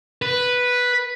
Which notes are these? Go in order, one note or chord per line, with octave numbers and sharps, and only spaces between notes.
B4